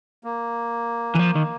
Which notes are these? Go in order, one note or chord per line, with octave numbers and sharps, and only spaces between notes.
A#3
E3
F3
D#3